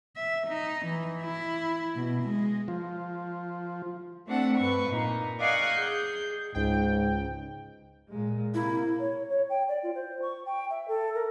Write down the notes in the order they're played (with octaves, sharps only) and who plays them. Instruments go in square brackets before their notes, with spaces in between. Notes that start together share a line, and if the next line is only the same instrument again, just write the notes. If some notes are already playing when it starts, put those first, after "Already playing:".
[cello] E5
D#4
E3
E4
B2
G#3
[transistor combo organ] F3 F4
[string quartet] A3 C4 D4 A4 F#5
G2 B4 C#6
A#2 D#4
D5 D#5 F5 F#5 G#5 C#6
G#4 G6
[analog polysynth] C#2 G5 [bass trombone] G#2
[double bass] A#2 G#3
[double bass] C3 A#3 [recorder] E4
[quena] C#5
C#5
G5
D5
F4
C5
C#6
G5
E5
A4
A#4